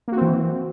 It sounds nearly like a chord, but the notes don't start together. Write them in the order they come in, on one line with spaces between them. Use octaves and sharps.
A#3 F#4 C4 E3